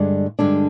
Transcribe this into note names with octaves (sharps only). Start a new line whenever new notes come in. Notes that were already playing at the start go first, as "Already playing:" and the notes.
Already playing: G2 D3 G#3 D4
G2 D3 G#3 D4